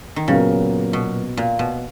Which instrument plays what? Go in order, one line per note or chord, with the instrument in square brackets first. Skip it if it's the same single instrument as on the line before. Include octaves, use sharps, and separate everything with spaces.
[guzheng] D#3
[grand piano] A#2 F#3 B3 F#4 A#4 [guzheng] C#3
[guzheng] B2
A#2
B2